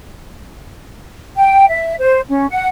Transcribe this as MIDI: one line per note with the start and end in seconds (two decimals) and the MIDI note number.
1.36 1.65 79
1.69 1.95 76
1.99 2.20 72
2.29 2.47 61
2.49 2.67 78